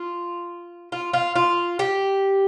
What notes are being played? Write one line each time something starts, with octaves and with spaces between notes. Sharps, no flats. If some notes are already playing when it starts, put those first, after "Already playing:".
Already playing: F4
F4
F4
F4
G4